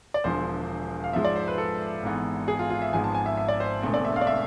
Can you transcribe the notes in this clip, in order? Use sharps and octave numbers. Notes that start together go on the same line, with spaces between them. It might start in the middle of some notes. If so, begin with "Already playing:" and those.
D5
E1 E2 D3 F3 C5
F5
G#2 F3 G#3 E5
D5
C5
B4
A4
G#1 G#2 E3 B3
G#4
F4
F4
E5
G#1 G#2 F3 G#3 B3 G#5
A5
G#5
E5
E5
D5
C5
E1 E2 D3 A3 C4
D5
E5
F5
D5
E5